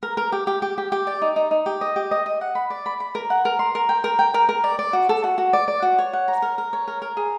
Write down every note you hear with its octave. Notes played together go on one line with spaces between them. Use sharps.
A#4
A#4
G4
G4
G4
G4
G4
D5
D#4
D#4
D#4
G4
D#5
G4
D#5
D#5
F#5
B5
D5
B5
B5
A#4
F#5
A#4
C6
A#4
G5
A#4
G5
A#4
A#4
D5
D5
F#4
A4
F#4
F#4
D5
D5
F#4
C#5
F#5
A#5
A#4
A#4
C#5
A#4
A#4
G#4